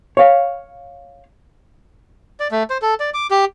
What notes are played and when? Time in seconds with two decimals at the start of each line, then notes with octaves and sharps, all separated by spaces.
0.17 C#5 F5
2.40 D5
2.51 A3
2.70 C5
2.82 A4
3.00 D5
3.14 D6
3.31 G4